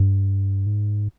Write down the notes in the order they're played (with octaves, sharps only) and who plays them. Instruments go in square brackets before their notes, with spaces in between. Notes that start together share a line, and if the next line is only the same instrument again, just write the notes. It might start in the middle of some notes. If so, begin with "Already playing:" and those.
Already playing: [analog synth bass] G2
G#2